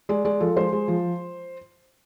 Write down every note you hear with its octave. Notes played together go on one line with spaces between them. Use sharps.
G#3 D5
G#3 D5
F3 A4
G#3 C5
G#3
F3